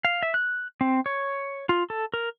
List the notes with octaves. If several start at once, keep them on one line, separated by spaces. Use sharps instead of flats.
F5
E5
F#6
C4
C#5
F4
A4
A#4